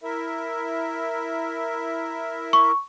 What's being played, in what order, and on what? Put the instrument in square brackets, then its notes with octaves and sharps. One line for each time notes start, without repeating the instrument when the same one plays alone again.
[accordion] E4 A#4 E5
[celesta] C#6